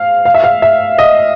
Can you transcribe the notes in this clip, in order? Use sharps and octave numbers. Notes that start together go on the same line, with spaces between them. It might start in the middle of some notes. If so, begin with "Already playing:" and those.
Already playing: F5
F5
E5
F5
E5
D#5